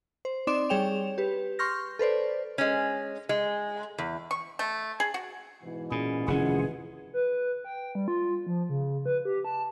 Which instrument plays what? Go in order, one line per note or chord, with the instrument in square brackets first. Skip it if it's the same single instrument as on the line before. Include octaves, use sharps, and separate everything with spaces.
[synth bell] C5
C4 D#4 D5 C6 D6 E7
G3 G#4 C#5 G5 E7 F7
G4 B4
C6 C#6 F6 G6 A#6
A4 B4 C5 D5
[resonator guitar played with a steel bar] G#3 C#4
G#3
E2
[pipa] C#6
A3
G#4
F#4
[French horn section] G#2 B2 E3
[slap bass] A#2 [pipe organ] C#4 E4 G#4
[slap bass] F1 D#3 C#4 [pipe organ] F4 F#5 [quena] G#4
[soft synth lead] B4
G5
G3
F4
F3
C#3
B4
G4
A5